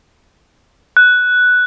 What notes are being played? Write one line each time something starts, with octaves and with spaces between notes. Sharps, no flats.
F#6